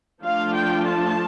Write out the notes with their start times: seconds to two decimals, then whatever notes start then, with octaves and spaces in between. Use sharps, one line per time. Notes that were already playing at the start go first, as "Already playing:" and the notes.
0.23 F3 A3 D4 F4 F5
0.55 G5
0.86 A5